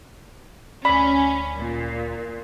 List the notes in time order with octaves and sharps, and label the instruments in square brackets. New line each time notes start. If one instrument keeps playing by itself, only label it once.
[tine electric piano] D2 D5 [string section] C#4 [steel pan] B5
[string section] A#2